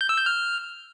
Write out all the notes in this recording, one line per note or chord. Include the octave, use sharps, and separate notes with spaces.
G6
E6
G6
F6